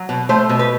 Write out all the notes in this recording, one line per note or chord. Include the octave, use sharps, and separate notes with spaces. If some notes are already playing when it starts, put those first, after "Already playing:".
Already playing: F#3
B2
A3 C5
B2
B4